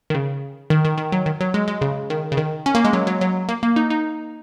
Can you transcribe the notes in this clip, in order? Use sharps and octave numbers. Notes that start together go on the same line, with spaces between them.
D#3
C#3
D#3
D#3
D#3
F#3
D#3
F#3
G#3
G#3
C#3
D#3
C#3
D#3
C#4
A#3
G#3
F#3
F#3
F#3
A#3
A#3
D#4
D#4